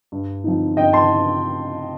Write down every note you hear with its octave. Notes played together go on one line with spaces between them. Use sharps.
G2
F3 C4 D#4
G2 D#5 G5
A5 C6